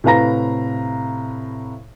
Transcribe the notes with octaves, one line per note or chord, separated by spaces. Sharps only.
A2 C3 B4 F5 A#5 A#6